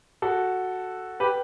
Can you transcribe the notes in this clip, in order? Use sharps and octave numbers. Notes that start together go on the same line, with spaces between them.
F#4 A4
G4 B4